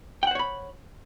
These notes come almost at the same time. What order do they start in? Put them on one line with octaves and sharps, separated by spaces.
G5 F#5 C5 C#5 B5